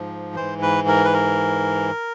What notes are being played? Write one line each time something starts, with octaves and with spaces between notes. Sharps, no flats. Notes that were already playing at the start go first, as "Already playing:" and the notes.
Already playing: G#2 F3
G#2 E3 C5
B4
A#4
B4
A#4